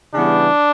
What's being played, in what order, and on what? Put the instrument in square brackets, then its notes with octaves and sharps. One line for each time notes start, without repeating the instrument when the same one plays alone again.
[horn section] C#3 E3 G3 B3 D4